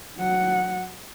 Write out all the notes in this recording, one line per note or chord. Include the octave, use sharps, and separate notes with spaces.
F#3 F#5